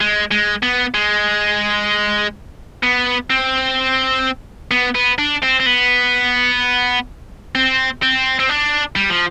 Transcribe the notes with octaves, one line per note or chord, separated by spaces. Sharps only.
G#3
G#3
B3
G#3
B3
C4
B3
B3
D4
C4
C4
B3
C4
C4
C4
D4
G3
F3